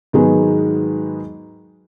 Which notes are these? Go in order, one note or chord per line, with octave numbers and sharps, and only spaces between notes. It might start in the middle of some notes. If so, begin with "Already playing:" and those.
G#2 D#3 F#3 G#3 B3